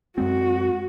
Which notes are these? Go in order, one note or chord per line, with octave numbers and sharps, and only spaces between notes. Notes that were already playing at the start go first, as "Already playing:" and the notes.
F#2 G#3 C4 F#4